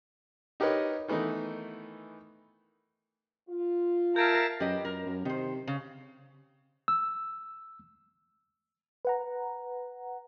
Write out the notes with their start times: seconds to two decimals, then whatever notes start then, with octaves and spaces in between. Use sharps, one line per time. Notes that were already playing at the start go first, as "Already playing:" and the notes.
0.60 D#4 G4 A#4 B4 C#5 D#5
1.08 D#3 E3 A3 B3 D#4
3.49 F4
4.16 A#4 E5 F5 A5 G6 G#6 D7
4.60 F#2 G4 B4 D#5
4.85 F#2 A#4
5.06 F#2
5.25 C3 D#3 C5
5.67 C#3
6.88 E6
9.05 B4 F#5 A#5